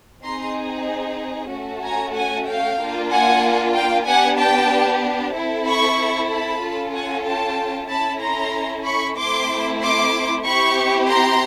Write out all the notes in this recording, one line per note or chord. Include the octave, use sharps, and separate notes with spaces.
C4 D#4 G#4 A#5 C6
A3 C#4 F#4 A4
G#5 A#5
F#5 G#5
F5 G5
A#3 D4 F4
F#5 G#5
F5 G5
B3 D4 G4 F#5 G#5
G5 A5
C4 E4 A4
B5 C#6
A5 B5
C#4 F4 A4
F#5 G#5
G5 A5
C#4 E4 A4 A5 B5
A#5 C6
B5 C#6
A3 C4 E4 C6 D6
C6 D6
C4 E4 G4 B5 C#6
A#5 C6